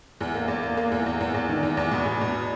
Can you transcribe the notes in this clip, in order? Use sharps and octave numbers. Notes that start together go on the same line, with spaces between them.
E2
A#3
E2
A#3
A#3
E2
E2
E2
E2
D#3
E2
E2
B2
E2
B2